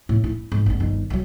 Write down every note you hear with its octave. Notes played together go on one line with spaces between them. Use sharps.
A2
E4
G#2
G1 B3
G1 D#3
D#3 F#3